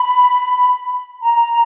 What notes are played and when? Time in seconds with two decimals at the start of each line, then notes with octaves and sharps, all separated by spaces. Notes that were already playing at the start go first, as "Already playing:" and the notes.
Already playing: B5
1.23 A#5